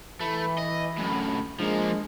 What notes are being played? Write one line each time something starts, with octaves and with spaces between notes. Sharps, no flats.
E3 A3 B5
D#5
F#2 A2
F3 G#3 A#3 D4